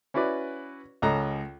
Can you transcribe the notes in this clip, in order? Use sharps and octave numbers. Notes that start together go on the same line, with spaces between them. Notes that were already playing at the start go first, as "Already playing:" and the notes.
C#4 E4 F#4 B4 D5
C#2 C#4 A4 D#5 A#5 F#6